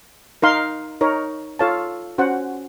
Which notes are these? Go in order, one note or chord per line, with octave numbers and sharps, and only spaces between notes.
D#4 A#4 F5 C6
D#4 A#4 C#5
F4 A4 C#5 F5 A5
C#4 F#4 C5 F#5